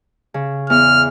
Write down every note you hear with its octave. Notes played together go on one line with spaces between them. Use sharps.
C#3
E2 F6